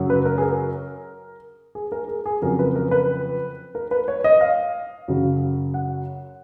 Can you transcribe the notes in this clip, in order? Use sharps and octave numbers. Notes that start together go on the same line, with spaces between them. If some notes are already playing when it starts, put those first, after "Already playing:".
Already playing: F#2 C#3 F#3
B4
A#4
G#4
A#4
G#4
A#4
G#4
G#4
F2 C#3 F#3 A#4
B4
A#4
B4
A#4
B4
C#5
D#5
F5
F#2 C#3 F#3
F#5